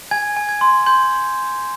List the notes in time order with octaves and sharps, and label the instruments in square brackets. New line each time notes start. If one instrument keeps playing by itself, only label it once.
[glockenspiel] G#5 G#6
G#5
G#6
C6
C6 G6